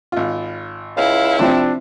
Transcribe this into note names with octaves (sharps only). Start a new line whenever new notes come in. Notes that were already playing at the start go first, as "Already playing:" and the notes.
G#1 F4
C#2 E4 F5
C3 F3 C4 D4